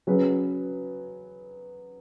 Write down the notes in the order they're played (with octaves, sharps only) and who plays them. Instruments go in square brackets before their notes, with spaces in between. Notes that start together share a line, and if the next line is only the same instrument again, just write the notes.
[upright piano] F#3 C#4 G#4 B4